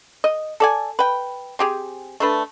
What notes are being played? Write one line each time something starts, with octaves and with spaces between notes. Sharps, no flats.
D#5
A4 D5 G#5
B4 G5
C4 G4 G#4
A3 D4 B4